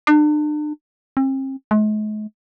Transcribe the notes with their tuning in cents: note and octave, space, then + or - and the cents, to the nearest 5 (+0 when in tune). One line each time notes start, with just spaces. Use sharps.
D4 +40
C4 +40
G#3 +45